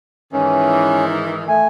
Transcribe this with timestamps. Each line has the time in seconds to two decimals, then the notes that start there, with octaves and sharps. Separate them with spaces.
0.33 G#2 D#3 E3 C#4
1.48 A3 G#5